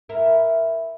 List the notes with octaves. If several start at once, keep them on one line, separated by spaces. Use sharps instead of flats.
E4 A#4